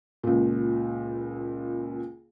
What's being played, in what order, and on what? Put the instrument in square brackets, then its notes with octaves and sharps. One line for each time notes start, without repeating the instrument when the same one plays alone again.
[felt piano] C#2 A#2